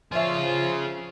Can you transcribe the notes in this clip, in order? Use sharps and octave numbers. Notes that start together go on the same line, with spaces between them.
F3 F4 G#4 C#5 D5 E5